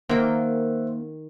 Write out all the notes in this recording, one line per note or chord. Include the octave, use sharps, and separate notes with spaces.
D#3 A#3 C5 E5 F#5 G5